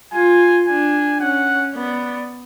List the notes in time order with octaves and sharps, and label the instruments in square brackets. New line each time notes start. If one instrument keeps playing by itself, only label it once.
[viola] F4 [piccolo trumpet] G#5
[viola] D4 [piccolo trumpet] G#5
[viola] C#4 [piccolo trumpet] F#5
[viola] B3 [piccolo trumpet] D5